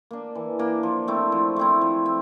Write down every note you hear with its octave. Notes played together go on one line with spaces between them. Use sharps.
A#3 D4
E3
A#3 D4
F3
A3 C4 E4
F3
A3 C4 E4
F3
C4